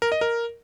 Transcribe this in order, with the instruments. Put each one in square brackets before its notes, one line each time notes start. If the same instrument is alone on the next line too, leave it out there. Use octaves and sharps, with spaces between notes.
[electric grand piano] A#4
D#5
A#4